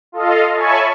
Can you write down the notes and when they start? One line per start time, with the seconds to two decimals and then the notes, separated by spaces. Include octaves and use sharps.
0.12 F4 A4 D#5 F5
0.54 C#5 E5 G#5 A5 B5 C#6